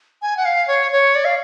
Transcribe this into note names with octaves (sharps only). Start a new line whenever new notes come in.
G#5
F#5
F5
C#5
C#5
D5
F5